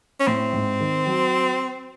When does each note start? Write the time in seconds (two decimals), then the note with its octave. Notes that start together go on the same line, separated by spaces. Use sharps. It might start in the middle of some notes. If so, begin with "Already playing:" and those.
0.20 C#4
0.27 A2 C4
0.53 G#2
0.81 D#3
1.06 F#3